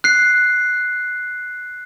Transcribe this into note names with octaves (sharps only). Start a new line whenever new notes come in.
F#6 C7